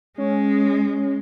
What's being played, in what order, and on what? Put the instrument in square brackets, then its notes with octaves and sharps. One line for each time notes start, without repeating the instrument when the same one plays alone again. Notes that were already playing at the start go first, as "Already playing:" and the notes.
[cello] G#3 [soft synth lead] C#4